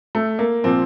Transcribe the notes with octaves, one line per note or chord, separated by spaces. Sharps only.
A3
A#3
A#2 F3 C4